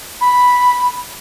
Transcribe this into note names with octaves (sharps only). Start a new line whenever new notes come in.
B5